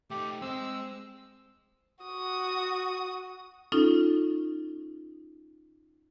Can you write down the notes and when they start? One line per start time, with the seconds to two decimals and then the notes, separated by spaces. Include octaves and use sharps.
0.11 A3 D#4 G4
0.42 G#3 C4 E6
2.04 F#4 D#6
3.72 C#4 D#4 F4 A4